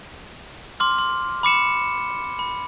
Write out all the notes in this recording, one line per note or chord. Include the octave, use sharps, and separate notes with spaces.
C6 D6 F6
C6
B5 D6 C#7 E7
B5